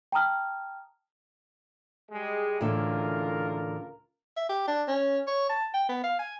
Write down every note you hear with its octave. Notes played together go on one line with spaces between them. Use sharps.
G5 A5 A#5 D#6 F6
G3 G#3
C#2 A2 D3 E3 F4 A#4
E5
G4
D4
C#4
C#5
A5
G5
B3
F5
G#5